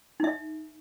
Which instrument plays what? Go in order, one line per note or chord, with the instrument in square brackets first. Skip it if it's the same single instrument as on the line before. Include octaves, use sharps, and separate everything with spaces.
[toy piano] D#4 E5